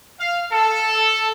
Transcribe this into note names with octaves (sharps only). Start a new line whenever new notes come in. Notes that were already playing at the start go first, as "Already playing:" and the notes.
F5
A4